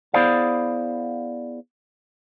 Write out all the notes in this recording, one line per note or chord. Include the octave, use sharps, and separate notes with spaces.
B3 E4 G#4 C5 D5 F5